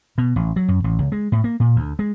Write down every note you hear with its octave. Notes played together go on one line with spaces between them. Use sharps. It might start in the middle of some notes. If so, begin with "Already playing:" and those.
B2
A1
F#3
F#2
A1
C#2
G#3
A2
A#3
A#2
D2
G#3